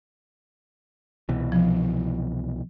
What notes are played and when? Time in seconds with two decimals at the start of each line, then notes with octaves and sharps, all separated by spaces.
1.29 C2 B2 E3
1.52 F3